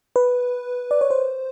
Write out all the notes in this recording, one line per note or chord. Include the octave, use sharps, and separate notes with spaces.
B4
D5
C#5
C5